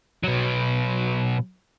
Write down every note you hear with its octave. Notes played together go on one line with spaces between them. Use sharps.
B2 F#3